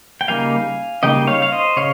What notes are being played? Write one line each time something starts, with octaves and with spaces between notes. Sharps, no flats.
G5
C#3 G3 A#3 D#4 F5 G#5
C#3 G3 A#3 D#4 D#5 G5
C#5 F5
F5
C5 D#5
C#3 C#5 F5